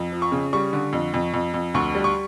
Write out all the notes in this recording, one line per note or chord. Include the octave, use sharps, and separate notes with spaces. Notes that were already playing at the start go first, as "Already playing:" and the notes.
Already playing: F2
F3
C#6
C#3
G3 C#6
D3
F2
F2
F2
F2
D2 C#6
G3
C#6